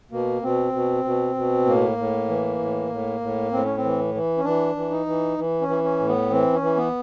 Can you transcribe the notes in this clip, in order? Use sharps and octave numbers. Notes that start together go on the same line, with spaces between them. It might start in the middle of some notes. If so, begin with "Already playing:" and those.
B2 A#3
B2 C4
B2
B2
B2
A2 A#3
A2
E3
A2
A2
A2
A2 C4
C#4
C4
E3
E3
C#4
E3 D4
E3
D#4
E3
E3
C#4
E3
C#4
A2
B3
E3 C4
C#4
E3
B3